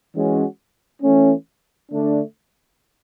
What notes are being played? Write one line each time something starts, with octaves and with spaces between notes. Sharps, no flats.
E3 G#3 C#4 F#4
E3 A3 C#4
D3 A3 D4